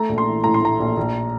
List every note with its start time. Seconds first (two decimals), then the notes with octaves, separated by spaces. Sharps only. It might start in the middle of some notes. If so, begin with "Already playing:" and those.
Already playing: A3 A#5
0.09 A#1
0.18 C6
0.27 E3
0.44 A2 A#5
0.54 C6
0.62 A3 A#5
0.80 A#1
0.97 A#1